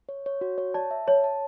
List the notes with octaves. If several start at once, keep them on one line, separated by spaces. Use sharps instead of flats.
C#5
C#5
F#4
C#5
D5 A5
E5
C#5 A5
A5